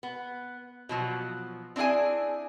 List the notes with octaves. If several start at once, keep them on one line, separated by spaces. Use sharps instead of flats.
B3
B2 F3 F#3
C4 D4 E4 G#4 G#5